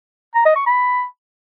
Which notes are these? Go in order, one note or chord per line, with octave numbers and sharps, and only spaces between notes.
A#5
D#5
C#6
B5